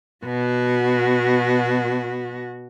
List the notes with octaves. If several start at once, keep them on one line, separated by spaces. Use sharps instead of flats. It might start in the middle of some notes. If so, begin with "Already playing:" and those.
B2 F#4